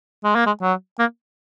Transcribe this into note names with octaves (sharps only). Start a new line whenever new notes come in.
G#3
A#3
G#3
F#3
A#3